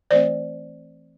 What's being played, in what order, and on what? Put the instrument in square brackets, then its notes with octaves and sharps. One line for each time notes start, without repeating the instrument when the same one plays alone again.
[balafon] E3 A3 C4 C5 D5